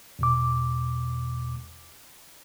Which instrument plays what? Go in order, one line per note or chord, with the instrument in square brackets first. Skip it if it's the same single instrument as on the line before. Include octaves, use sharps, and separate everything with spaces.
[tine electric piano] E2 B2 D6